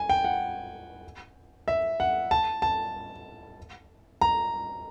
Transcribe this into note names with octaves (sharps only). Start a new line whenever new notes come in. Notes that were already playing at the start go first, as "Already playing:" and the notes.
Already playing: G#5
G5
F#5
E5
F#5
A5
A5
A#5